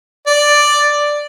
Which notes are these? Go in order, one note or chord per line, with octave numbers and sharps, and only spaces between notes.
D5